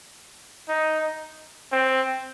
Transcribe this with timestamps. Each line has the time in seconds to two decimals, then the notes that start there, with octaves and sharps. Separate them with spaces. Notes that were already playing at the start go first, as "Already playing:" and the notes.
0.68 D#4
1.72 C4